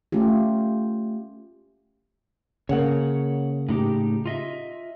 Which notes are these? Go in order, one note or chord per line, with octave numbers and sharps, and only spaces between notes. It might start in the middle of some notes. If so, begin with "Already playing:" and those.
A3 C#4 F4 G4
C#3 A#3 C#5 F#5
A2 D#4 G4
F4 D#5 E5